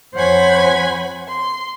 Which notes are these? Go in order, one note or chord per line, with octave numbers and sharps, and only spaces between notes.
F2 C5 C#5 F#5 G#5 B5
C6